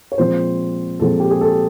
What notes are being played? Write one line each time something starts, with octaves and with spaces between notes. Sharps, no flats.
C#5
A#2 F3 G#3 C4 C5
A#2 F3 G#3 C4 A4
G4
G#4
A4